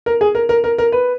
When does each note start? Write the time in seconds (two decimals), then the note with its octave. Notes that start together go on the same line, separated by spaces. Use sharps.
0.06 A#4
0.21 G#4
0.35 A#4
0.49 A#4
0.64 A#4
0.78 A#4
0.92 B4